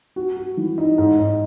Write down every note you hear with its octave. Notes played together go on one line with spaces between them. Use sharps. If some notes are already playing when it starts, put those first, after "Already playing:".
F#4
F#4
E3
D#4
G#2
G#2